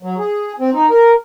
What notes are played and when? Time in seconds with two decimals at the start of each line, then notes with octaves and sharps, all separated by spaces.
0.03 F#3
0.19 G#4
0.59 C4
0.74 D#4
0.90 A#4